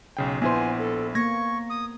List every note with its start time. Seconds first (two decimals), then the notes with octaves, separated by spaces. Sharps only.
0.17 B1 C#3 G5
0.42 A#1 B3 E4 C5 G#5 C6
0.79 A4
1.15 A#3 C#6 G#6 A#6
1.70 D#6